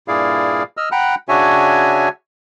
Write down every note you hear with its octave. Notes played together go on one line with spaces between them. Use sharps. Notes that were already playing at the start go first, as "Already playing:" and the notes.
G2 A#2 E4 G#4 D5 F5
D#5 E6 F6
F#5 G5 A#5 B5 F#6
C#3 D4 F#4 C#5 E5 G#5